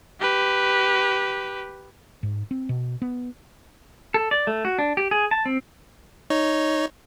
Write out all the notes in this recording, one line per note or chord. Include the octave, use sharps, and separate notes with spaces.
G4 B4
G#2
C4
B2
B3
A4
D5
A3
F#4
D4
G4
G#4
A5
C4
D#4 C#5